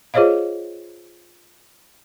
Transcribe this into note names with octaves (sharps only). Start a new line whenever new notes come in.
F4 G#4 C5 C#5 D#5 F5